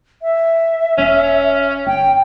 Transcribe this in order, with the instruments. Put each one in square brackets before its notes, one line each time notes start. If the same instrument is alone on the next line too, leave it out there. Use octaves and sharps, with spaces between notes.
[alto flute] E5
[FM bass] E1 [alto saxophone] C#4
[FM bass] G1 [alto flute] G5